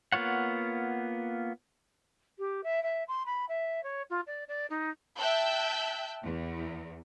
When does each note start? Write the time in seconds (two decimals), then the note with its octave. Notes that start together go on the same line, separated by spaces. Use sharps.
0.12 A#3 B3 F4 C#5 F#5
2.39 G4
2.64 E5
2.83 E5
3.08 C6
3.26 B5
3.49 E5
3.83 C#5
4.10 F4
4.27 D5
4.48 D5
4.70 D#4
5.17 E5 G5 A5 E6 F#6 G6
6.22 E2